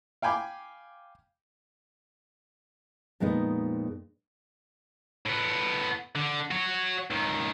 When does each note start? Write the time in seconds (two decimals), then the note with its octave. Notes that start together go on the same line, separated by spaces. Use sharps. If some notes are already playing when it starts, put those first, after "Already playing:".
0.22 F5 G5 G#5 B5 D6
3.20 F2 A#2 G#3 B3 D#4
5.26 A2 B3
6.15 D3
6.51 F#4 C#5
7.10 C#2 D#3